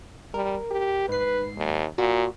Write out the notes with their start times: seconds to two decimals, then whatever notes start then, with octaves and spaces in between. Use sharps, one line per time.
0.34 G3 A#4
0.71 G4
1.09 G#2 B4 C7
1.57 D#2
1.98 A#2 F#4